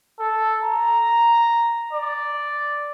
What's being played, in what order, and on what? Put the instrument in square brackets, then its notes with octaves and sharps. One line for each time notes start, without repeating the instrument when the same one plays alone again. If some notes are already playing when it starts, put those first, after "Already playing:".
[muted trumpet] A4
A#5
D5